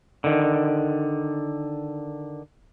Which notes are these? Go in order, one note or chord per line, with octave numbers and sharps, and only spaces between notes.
D3 D#3